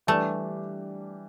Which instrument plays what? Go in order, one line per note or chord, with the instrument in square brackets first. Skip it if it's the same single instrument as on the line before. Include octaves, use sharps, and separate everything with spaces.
[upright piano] E3 G3 D4 G4 D5 [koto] A3